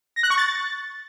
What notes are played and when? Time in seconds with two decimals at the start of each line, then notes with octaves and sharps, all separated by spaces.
0.16 A#6
0.23 F#6
0.30 C#6
0.37 A6